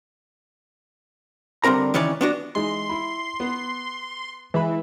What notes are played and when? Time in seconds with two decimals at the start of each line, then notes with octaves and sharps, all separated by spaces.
1.64 G2 D3 C4 A#4 A#5
1.94 D#3 E3 C#4 C#5 D5
2.21 B3 D4 F#4
2.55 E3 G#3 D#4 C6
2.89 E4 B5
3.40 B3
4.54 E3 G#3 E5 B5